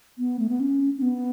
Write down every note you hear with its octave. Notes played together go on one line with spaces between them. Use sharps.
B3
A3
B3
C#4
C#4
B3